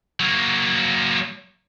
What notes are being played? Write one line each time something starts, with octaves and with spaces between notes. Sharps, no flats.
F#3 A#3